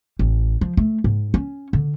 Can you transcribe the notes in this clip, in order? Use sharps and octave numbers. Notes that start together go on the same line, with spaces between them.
A1
F3
A3
G#2
C#4
D3